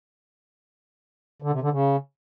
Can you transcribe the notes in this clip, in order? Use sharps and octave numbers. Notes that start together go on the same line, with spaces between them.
D3
C3
D3
C#3